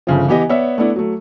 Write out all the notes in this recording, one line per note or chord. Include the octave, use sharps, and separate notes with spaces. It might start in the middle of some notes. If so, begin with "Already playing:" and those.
G1 C#3 F3
E3 B3 G4 D#5
B3 C#5 D5 E5
A3 B3 D4 E4
F#3 A3